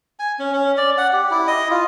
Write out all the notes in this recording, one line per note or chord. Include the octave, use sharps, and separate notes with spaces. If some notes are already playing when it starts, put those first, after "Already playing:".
G#5
C#4
C#4
D5
F#5
G4
E4
D#5
F4